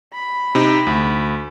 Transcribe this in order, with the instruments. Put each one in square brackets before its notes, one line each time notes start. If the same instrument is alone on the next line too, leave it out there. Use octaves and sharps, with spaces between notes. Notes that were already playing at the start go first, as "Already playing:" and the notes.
[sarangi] B5
[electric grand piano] C3 D#4
D2